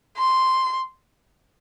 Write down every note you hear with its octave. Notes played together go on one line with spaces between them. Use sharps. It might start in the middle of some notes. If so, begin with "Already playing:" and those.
C6